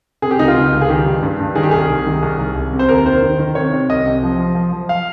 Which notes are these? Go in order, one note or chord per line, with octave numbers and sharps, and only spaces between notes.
C3 G#4
G4
C#2 D#4
F4
C#2
C#2
G#4
D#3 G4
G2
G2
G2
D#3 G#4
G4
C2 G#4
C2
D#3
C2
C2
C2
C3
C5
D#2 A#4
D#3 C5
D#3
D#3
C3 C#5
C3
C2 D#5
C3
F3
F3
F3
F3
F5